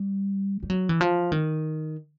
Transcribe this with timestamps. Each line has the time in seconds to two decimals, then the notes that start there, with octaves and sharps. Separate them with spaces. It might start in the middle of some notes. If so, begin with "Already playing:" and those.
Already playing: G3
0.63 G3
0.70 F#3
0.89 E3
1.01 F3
1.32 D#3